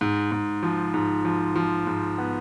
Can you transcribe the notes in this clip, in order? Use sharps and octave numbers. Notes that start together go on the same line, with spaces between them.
G#2
G#2
F3
G#2
F3
F3
G#2
B3